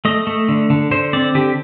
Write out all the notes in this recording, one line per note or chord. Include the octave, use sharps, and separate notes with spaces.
A3 D#5
A3
D3
D3
D3 C5
C4 D5
D3 G4